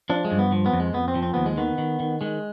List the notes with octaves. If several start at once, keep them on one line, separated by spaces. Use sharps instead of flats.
F3 D4
G#3
G2
B3
F3
B3
F2
G#3
F2 B3
C4
F3
C4
D#2 B3
G#3
D#3 B3
D#3
D#3
D#3 G#3